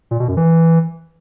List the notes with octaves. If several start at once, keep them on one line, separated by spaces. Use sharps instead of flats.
A#2
B2
F#2
E3